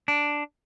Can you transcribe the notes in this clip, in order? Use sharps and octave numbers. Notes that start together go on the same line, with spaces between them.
D4